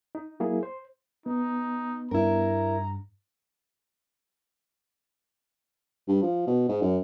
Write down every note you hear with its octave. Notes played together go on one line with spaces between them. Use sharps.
D#4
F#3 A#3 E4 G#4
C5
B3 D#4
G2 E4 A#4 A#5
G2
F3
B2
G#2
F#2